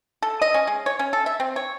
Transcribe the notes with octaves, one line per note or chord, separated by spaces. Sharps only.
A4
D#5
C#4
G#3
C#5
C#4
A4
E5
C4
C#5